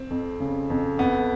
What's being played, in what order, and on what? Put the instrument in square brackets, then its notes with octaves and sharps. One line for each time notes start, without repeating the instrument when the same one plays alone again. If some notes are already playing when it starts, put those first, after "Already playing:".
Already playing: [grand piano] C4
[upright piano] F2
C#3
F2
[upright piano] F2 [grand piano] B3